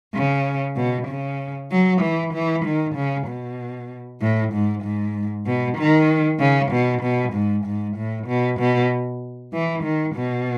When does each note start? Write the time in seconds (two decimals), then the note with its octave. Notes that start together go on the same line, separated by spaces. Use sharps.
0.15 C#3
0.76 B2
1.08 C#3
1.71 F#3
2.01 E3
2.34 E3
2.65 D#3
2.95 C#3
3.27 B2
4.22 A2
4.53 G#2
4.83 G#2
5.46 B2
5.78 D#3
6.40 C#3
6.72 B2
7.03 B2
7.33 G#2
7.65 G#2
7.97 A2
8.27 B2
8.60 B2
9.53 E3
9.84 D#3
10.16 B2